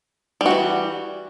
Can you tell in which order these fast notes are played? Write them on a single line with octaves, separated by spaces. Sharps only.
G3 F#4 E3